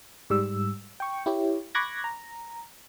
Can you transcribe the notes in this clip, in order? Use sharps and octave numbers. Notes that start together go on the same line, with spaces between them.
G#2 G3 E6
G5 C#6
E4 G4 C#5
B5 C#6 D6 F#6 G#6 A#6
A#5